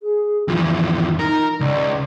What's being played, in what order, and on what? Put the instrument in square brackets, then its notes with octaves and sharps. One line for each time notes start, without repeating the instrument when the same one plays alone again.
[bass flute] G#4
[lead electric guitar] F2 E3 [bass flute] F4
[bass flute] D#4 [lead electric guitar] A#4
[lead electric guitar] C#2 [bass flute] D5